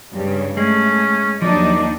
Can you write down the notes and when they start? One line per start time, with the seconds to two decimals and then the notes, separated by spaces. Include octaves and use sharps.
0.12 G2 C#3
0.57 G#3 A3 C#4
1.42 D#2 F3 F#3 D4 D#4 D5